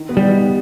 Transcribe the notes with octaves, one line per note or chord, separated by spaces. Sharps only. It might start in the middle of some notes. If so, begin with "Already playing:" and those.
Already playing: D#3
B3
G3
D#4